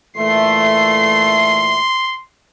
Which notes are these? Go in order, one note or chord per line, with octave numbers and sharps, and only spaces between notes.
A#2 E3 A3 E5 C6 C7